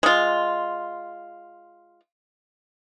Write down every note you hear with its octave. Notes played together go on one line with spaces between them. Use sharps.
G#3 F4